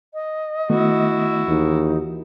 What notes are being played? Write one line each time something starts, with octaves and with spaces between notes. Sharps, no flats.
D#5
D#3 A3 B3 E4 F#4
D#2 E3 D#4